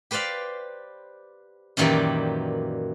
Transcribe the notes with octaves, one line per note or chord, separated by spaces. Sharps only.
G4 B4 C5 D5 F5
F#2 A#2 D#3 E3 G4 D5